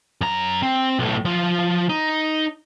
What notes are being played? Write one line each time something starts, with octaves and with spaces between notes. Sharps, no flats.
F#2 A#5
C4
B1 A2
F3 F4
D#4